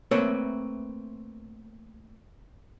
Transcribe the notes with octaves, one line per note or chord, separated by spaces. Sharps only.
A3 A#3 C4 B4 C#5 E5